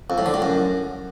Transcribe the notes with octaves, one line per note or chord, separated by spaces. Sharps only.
F2
A2
D3
A2
F#2